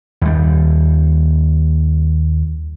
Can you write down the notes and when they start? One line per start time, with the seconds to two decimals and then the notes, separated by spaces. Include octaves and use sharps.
0.21 D#2 G3